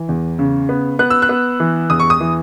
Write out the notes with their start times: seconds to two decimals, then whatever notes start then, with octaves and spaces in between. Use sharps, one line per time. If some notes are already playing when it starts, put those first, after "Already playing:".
Already playing: E3
0.09 E2
0.39 C#3
0.69 B3
0.99 B3 F#6
1.10 E6
1.22 F#6
1.29 B3
1.60 E3
1.90 E2 D#6
1.99 C#6
2.10 D#6
2.20 E3